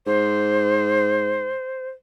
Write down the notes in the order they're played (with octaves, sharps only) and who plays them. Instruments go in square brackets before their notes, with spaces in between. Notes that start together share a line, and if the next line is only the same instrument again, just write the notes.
[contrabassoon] G#2 [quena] C5